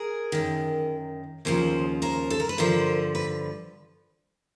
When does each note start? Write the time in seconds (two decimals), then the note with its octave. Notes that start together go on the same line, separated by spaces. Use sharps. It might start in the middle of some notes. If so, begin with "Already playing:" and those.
Already playing: G#4 A#4
0.32 F#2 D#3
1.45 D#2 C#3 F3 A#4 C5
2.02 A#4 C5
2.30 A4
2.40 A#4
2.49 B4
2.58 G2 D3 F3 A#4 C5
3.15 B4